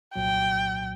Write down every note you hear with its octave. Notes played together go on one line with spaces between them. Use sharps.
C2 A#2 F#3 G5